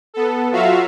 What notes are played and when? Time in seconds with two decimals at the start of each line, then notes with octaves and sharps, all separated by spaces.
0.14 B3 A4
0.51 F#3 F4 F#4 E5 F5